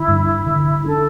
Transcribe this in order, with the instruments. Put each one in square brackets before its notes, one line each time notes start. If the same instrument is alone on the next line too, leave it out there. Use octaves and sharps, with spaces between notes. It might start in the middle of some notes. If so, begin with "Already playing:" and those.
Already playing: [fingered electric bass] D3 [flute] E4
[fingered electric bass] G2
D3
[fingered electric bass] D4 [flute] A4